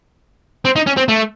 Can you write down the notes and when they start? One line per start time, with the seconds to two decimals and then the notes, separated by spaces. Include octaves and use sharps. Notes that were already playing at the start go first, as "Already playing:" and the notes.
0.65 C4
0.76 D#4
0.87 C#4
0.97 C4
1.09 A3